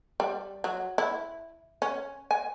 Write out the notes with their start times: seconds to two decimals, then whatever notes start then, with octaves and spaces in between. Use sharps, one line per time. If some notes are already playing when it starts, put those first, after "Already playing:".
0.20 G3
0.64 F#3
0.98 E4
1.82 C#4
2.31 G#5